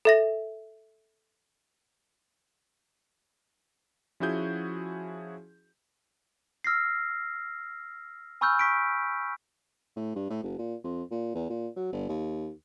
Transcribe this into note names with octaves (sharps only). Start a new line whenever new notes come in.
A4 E5 A#6
F3 C#4 E4 F#4 G#4 G6
E6 F6 A#6 C7
G#5 B5 C#6 E6 F6 G6
C#6 B6 D7
A2
G2
A2
F#1
A#2
F2
A#2
E2
A#2
F#3
G1
D#2